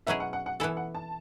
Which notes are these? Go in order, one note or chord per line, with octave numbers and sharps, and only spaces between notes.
B2 F#3 C#4 E4 G#4 E5
F#5
F#5
F#5
E3 B3 E4 A4 G#5
F#5
A5